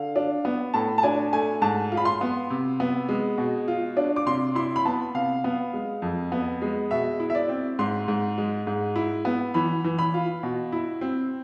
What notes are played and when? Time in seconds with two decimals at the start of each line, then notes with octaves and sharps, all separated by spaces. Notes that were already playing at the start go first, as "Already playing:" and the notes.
Already playing: D3 F5
0.16 D4
0.45 B3
0.74 A2 A5
0.98 A5
1.03 D4 G#5
1.33 A3 G#5
1.62 G#2 A5
1.92 F4
1.97 B5
2.05 C6
2.21 B3
2.50 C3
2.80 B3
3.09 G#3
3.38 B2
3.68 F4
3.97 D4
4.16 D6
4.27 C3 C6
4.55 E4 C6
4.76 B5
4.85 B3 A5
5.15 C3 F5
5.44 B3
5.73 G#3
6.02 F2
6.32 B3
6.62 G#3
6.91 B2 E5
7.20 E4
7.30 E5
7.35 D5
7.49 C4
7.79 G#2 C6
8.08 G#2
8.38 G#3
8.67 G#2
8.96 E4
9.25 B3
9.54 E3 B5
9.84 E3
9.99 B5
10.14 F4
10.43 B2
10.72 E4
11.01 C4